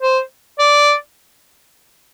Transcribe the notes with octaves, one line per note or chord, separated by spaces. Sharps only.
C5
D5